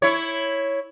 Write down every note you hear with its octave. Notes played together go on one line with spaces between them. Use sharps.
E4 C#5